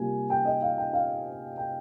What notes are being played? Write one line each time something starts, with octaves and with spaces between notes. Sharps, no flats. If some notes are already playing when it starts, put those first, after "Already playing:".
Already playing: C3 G3 A#3 F4 G#5
G5
D#5
F5
G5
F5
G5